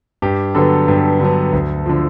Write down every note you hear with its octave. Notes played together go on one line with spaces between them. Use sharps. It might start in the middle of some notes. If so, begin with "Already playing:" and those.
G2 G4
D3 F#3 B3 A4
G2
D3 F#3 B3
D2
D3 F3